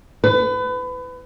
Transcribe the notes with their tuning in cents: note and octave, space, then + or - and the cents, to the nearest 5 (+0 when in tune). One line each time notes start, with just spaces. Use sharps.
B4 +30